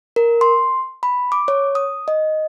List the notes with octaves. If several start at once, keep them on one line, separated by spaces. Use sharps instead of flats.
A#4
C6
B5
D6
C#5
D#6
D#5